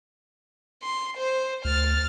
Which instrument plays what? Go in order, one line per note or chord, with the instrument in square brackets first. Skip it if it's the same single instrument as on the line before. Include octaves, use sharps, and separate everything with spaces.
[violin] C6
C5
[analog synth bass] D2 [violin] F6 A6